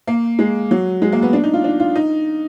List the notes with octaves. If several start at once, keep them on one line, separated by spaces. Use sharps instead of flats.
A#3
G#3
F#3
G#3
A#3
B3
D4
D#4
F4
D4
F4
D#4